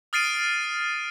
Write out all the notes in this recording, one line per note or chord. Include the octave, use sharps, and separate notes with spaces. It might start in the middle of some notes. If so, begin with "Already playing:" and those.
D#6 F6 A6 C7 D7 D#7